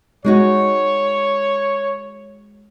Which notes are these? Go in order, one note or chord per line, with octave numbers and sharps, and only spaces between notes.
G#3 D#4 F#4 C#5